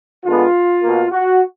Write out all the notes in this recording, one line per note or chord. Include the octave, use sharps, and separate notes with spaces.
D3 G#3 B3 F4
B2 A#3
F#4